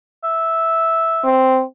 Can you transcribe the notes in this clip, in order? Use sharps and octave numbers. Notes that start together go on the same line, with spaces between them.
E5
C4